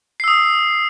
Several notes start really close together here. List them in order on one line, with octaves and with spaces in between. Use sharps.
C7 E6 D#6